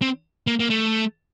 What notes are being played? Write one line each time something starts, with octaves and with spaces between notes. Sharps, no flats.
C4
A#3
A#3
A3